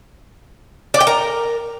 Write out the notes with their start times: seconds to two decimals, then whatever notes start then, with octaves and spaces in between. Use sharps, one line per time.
0.94 D5
1.00 G5
1.07 A#4